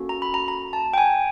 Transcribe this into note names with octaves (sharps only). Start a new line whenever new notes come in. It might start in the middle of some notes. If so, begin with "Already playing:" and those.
Already playing: A#3 C#4 F#4 A4
A#5
B5
A#5
A#5
A5
G5
G#5